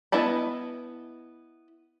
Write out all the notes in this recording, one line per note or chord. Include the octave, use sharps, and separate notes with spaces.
B3 E4 D#5 A5 B5